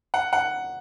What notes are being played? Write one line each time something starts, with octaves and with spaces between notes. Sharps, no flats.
F#5
F#5